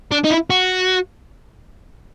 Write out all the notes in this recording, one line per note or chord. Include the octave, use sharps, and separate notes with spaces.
D4
D#4
E4
F#4